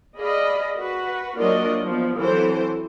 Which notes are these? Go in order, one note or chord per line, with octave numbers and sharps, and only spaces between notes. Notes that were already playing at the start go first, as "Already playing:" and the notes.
G#4 D5 D#5 F5 B5
F#4 B4
F#3 A#3 D4 F4 D5 D#5
F3 B3
E3 F#3 C4 A4 C5